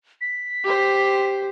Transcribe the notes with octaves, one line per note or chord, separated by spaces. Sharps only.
B6
G4 C5